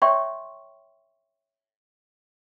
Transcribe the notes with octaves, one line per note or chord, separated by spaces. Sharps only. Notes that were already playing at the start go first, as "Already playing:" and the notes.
C#5 D5 E5 G5 C6 C#6